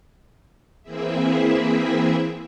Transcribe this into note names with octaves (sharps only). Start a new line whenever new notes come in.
E3 A#3 C4 E4 G#4 E5